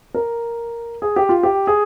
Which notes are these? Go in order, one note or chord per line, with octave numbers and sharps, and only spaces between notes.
A#4
G#4
G4
F4
G4
G#4